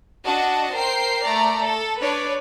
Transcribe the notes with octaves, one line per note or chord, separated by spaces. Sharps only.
D4 F#4 D#5 A5
A#4 C5 G5 C7
A3 D5 A#5
A4
D4 B4 C#5 D5